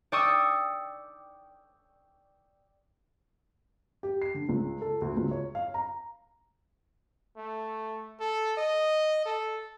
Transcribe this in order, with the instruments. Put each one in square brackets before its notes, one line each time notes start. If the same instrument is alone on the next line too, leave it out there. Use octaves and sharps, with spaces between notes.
[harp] D5 G5 C#6 D#6 E6
[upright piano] G4
C7
D3
C#2
A4
D2
C#2
C#5
F5
A#5
[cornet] A3
A4
D#5
A4